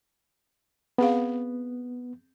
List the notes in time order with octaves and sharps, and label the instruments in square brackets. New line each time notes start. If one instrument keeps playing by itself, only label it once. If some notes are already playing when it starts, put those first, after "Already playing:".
[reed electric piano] B3 [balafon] C4 G#4 F5